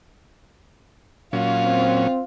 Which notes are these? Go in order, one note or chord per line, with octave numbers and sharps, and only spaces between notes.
A#2 F#3 C#4 F4
C4